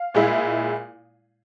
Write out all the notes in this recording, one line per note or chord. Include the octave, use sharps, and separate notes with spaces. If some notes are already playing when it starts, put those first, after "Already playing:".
Already playing: F5
A#2 G#3 E4